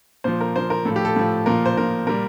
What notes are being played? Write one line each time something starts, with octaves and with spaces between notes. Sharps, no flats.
A#2 F3 C5
A#4
A#2 F3 C5
A#4
A2 F3 A4
G4
A4
A2 F3
A#2 F3 A#4
C5
A#2 F3 A#4
A#2 G3 A#4